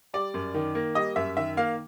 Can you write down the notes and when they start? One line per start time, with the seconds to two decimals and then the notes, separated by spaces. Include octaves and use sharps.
0.14 G3 D5
0.34 F#2
0.54 D#3
0.75 A#3
0.95 G3 D#5
1.16 F#2 E5
1.37 D#3 E5
1.57 A#3 F5